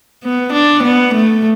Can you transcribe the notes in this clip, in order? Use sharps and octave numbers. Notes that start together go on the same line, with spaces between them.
B3
D4
B3
A3